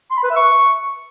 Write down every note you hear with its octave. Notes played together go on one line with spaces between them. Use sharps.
C6
B5
B4
E5
C#6